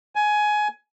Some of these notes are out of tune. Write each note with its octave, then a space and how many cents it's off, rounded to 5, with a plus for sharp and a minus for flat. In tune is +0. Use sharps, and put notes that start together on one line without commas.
G#5 +15